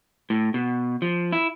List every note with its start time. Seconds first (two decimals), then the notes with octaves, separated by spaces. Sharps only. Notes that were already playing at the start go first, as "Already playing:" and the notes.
0.30 A2
0.54 B2
1.02 F3
1.32 E4